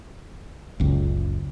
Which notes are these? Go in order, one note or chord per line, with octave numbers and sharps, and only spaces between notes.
F#1 C#2